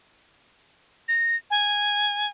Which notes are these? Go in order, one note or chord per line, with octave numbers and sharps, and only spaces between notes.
A#6
G#5